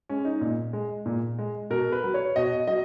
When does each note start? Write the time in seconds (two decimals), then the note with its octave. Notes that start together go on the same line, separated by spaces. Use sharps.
0.09 G#3 C#4
0.25 D#4
0.41 A#2
0.73 G#3
1.06 A#2
1.39 G#3
1.70 B2 A#4
1.92 B4
2.04 F#3
2.14 C#5
2.36 B2 D#5
2.67 F#3 D#5